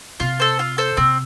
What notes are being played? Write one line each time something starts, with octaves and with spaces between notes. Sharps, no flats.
C3 F4
A4 C5
F4
A4 C5
C3 C4